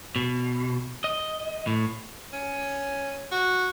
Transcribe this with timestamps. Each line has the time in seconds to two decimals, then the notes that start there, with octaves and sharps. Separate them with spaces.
0.16 B2
1.04 D#5
1.67 A2
2.33 C#4
3.31 F#4